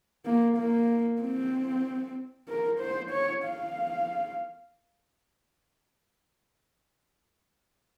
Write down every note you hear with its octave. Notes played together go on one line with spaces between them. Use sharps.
A#3
A#3
C4
A#4
C5
C#5
F5